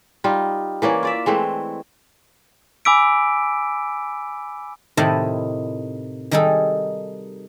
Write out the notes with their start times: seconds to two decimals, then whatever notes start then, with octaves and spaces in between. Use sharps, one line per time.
0.24 G3 D#4 F4
0.82 E3 A#3 C#4 D5
1.03 F4 D5 E5
1.26 E3 G#3 A3 C4
2.85 G#5 B5 D6 E6 B6 D7
4.97 A2 C3 D#3 E4 D#5 A5
6.31 D#3 G3 D#4 G#4 A4